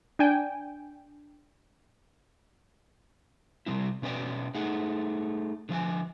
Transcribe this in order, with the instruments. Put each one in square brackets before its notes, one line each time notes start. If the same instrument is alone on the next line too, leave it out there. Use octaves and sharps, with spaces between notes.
[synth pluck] D4 G5 G#5
[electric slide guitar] C3 G3 C4 E4
B2 C#4 B4 D5 G5
A3 D#4 G#4 F#5
D3 F3 E5 G#5